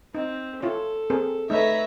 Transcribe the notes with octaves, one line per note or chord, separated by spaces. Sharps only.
C4 D#4
E4 F4 A4 C#5
C4 G#4 A#4
A3 D#4 B4 C#5 E5 A#5